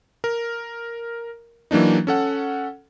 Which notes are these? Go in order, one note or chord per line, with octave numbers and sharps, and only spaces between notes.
A#4
E3 F#3 A#3 D4 D#4
C#4 A4 F#5